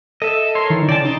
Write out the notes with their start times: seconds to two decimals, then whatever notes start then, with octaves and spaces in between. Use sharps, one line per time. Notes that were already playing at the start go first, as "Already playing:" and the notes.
0.22 A4 D#5 E5
0.55 A#4 C#5 C6
0.70 D#3 E3
0.89 C#3 D5 G5 A5
1.05 D#4 A#5 C6 D6